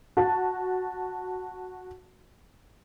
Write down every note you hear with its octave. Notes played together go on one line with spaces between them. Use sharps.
F#4 A5